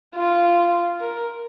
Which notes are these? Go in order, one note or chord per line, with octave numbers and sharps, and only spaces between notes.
F4
A#4